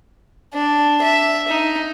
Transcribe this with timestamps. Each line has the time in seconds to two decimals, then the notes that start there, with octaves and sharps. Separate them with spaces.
0.54 D4
1.02 E5
1.48 D#4